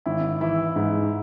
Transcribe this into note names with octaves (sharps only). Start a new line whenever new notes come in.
G#1 E4
E3 E4
G#2